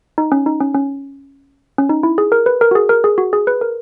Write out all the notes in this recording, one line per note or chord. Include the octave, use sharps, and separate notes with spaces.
D#4
C#4
D#4
C#4
C#4
C#4
D#4
E4
G#4
A#4
B4
A#4
F#4
G#4
A#4
G#4
F#4
G#4
B4
A#4